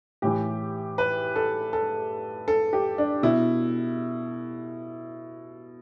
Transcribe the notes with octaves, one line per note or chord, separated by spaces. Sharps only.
A2 E3 G4
B4
A4
A4
A4
G4
D4
B2 E4